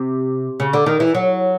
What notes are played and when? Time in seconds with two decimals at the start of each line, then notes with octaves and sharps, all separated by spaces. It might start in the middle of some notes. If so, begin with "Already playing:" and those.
Already playing: C3
0.60 C#3
0.73 D3
0.86 D#3
1.00 E3
1.15 F#3